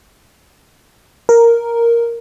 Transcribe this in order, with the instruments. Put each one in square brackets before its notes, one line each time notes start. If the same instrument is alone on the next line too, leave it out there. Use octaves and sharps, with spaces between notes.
[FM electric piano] A#4